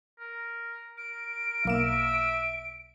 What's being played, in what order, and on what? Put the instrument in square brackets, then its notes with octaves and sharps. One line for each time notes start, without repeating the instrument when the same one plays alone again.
[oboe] A#4
[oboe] A#4 [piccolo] D7
[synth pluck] B1 A#3 E7 [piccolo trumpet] E5